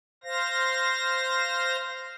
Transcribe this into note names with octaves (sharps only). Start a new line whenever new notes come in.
C5 F5 A#6